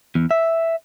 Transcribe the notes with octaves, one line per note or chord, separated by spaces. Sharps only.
E2
E5